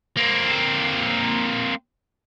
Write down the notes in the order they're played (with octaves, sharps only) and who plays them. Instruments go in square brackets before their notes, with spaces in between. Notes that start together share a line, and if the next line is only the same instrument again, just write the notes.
[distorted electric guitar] A#3 C4